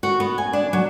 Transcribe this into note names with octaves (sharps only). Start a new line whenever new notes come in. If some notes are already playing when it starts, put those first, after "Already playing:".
F#4
B3
G#5
D4
F#3